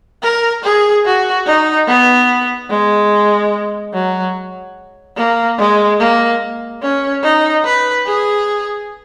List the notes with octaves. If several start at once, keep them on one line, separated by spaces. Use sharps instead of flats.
A#4
G#4
F#4
D#4
B3
G#3
F#3
A#3
G#3
A#3
C#4
D#4
B4
G#4